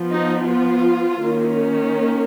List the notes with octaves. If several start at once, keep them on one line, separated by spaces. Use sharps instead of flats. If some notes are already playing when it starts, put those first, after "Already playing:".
Already playing: F3 B3
D#4
F4
D#3 A#3 C#4